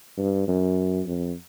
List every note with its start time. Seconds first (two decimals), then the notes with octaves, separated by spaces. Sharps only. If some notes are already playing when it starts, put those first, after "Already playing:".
0.18 G2
0.48 F#2
1.06 F2